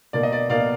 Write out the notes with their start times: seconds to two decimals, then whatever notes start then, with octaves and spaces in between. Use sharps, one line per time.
0.13 B2 A#3 D5
0.23 D#5
0.32 D5
0.49 B2 A#3 D5 F5